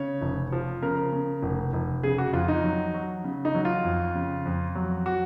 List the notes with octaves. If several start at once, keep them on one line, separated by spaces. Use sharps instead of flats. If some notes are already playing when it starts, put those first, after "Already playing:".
Already playing: C#3 C#5
F1
F3
C#3 A#4
C#3
F1
F1
C#3 G#4
F#4
F2 F4
D#4
F#3
F#3
C#3
D#4
F#3
F4
F2
C#3
F2
F#3
F#4